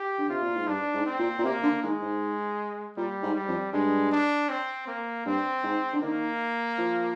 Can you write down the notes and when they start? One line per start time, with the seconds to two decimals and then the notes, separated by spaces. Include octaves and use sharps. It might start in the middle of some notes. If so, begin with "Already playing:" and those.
Already playing: G4
0.18 D3
0.30 C3 F4
0.43 A#2
0.56 G#2
0.67 G2 D4
0.94 G#2
1.06 C4
1.19 A#2
1.38 A#2
1.45 C3 A#3
1.63 D3
1.83 D#3 G#3
2.02 G#2
2.97 A#2 G3
3.23 G#2
3.35 G3
3.48 F2
3.73 G2 G#3
4.12 D4
4.49 C4
4.88 A#3
5.26 G2 C4
5.63 G#2
5.93 D3
6.02 D#3 A#3
6.78 F3